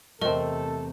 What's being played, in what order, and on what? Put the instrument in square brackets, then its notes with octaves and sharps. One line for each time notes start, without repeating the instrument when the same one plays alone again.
[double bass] E2 C3 [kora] A3 C4 [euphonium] A4 [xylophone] A#4 D#5